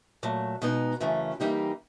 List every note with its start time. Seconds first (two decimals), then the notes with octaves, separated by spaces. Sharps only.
0.23 A#2 F#3 A3
0.62 B2 G#3 B3 D#4
1.00 F#2 C#3 E3 A3 C#4
1.40 E3 G3 A#3 D#4 G4